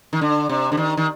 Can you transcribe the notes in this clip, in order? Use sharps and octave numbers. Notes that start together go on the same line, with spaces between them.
D#3
D3
C3
D3
D#3
D#3